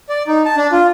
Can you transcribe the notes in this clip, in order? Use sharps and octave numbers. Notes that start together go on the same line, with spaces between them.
D5
D#4
A5
D4
F4